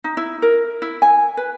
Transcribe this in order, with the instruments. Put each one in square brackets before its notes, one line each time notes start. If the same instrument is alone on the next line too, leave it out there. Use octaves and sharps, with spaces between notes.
[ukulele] D#4
E4
A#4
E4
G#5
B4